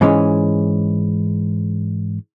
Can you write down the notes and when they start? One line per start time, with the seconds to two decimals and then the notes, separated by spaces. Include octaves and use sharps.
0.01 G#2 E3 G#3 C#4